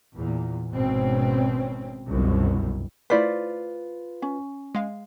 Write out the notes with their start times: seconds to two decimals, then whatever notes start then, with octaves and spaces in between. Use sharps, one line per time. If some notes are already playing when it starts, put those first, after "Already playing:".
0.16 E2 A#2
0.73 G#1 G#2 B2 C4 C#4
2.08 G1 C2 F#2 B2
3.10 A3 E4 F4 B4 C5 D5 B6
4.22 C#4
4.75 G#3 F5